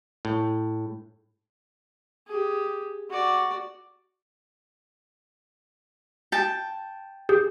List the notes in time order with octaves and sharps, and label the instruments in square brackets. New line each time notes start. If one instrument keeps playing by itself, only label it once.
[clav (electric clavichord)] A2
[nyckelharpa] G4 G#4
F#4 D5
[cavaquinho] G5 A5
[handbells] G4 G#4 G6